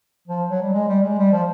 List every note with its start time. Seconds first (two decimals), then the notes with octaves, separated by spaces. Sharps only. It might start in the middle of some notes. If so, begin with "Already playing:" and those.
0.28 F3
0.50 F#3
0.62 G3
0.73 G#3
0.88 G3
1.03 G#3
1.18 G3
1.32 F3